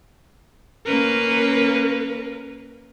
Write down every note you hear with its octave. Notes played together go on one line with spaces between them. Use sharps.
A#3 C#4 A#4 B4